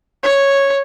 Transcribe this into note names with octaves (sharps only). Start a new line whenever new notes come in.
C#5